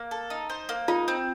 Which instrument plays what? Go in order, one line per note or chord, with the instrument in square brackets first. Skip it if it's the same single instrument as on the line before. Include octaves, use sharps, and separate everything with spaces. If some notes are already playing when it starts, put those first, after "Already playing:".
Already playing: [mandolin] A#3
A4
D#4
C5
A#3
[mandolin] D#4 [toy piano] F4
[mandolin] C4